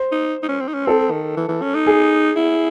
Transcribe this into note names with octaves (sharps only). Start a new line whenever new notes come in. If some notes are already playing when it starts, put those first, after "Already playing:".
Already playing: C5
D#4
D#4
C#4
C4
D#4
C#4
C4 A4
D#3
E3
E3
C#4
D#4
G#4
E4